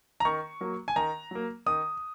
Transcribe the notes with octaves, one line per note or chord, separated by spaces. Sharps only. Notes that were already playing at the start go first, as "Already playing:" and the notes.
A#5
D#3 C#6
F#3 A#3
G#5
D#3 A#5
F#3 A#3
D#3 D#6